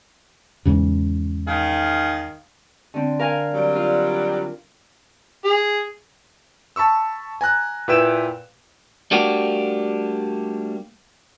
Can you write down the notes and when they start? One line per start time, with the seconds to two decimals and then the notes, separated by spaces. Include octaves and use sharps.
0.65 E2 G#2 C#3
1.48 D#3 G#4 F5
2.94 D3 C4
3.19 A#4 F5 G#5
3.54 F#3 G3
3.76 F4
5.45 G#4
6.76 A5 B5 C#6 E6
7.41 G#5 A#5 F#6
7.88 A#2 E4 B4 G5 E6 E7
9.11 G3 A3 A#3 D4 F#4 G4